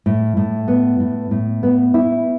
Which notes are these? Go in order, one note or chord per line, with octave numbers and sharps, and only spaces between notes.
A2
A2
B3
A2
A2
B3
E4